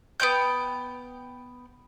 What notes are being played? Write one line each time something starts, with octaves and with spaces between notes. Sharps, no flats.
B3 C#4 G5 G6